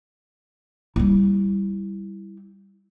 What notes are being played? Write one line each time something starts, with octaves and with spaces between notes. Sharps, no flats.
G3 E4